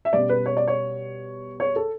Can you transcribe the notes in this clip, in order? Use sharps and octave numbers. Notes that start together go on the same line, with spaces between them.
E5
B2 G3 C#4 D5
B4
C#5
D5
C#5
C#5
A4